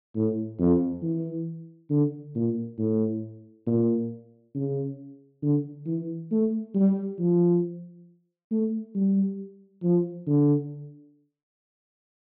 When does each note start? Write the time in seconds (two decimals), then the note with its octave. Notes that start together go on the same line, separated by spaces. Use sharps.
0.15 A2
0.59 F2
1.02 E3
1.90 D3
2.35 A#2
2.79 A2
3.66 A#2
4.55 C#3
5.43 D3
5.86 E3
6.31 A3
6.75 G3
7.19 F3
8.51 A3
8.95 G3
9.83 F3
10.27 D3